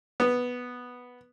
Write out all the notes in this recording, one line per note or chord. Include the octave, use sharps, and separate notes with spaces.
B3